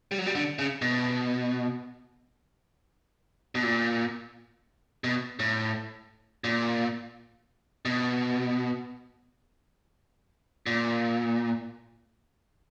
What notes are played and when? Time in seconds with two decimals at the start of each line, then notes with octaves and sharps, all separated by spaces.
0.11 G3
0.18 F#3
0.26 G3
0.35 D3
0.59 C#3
0.82 B2
3.55 B2
3.63 A#2
5.04 B2
5.39 A2
6.44 A#2
7.85 B2
10.66 A#2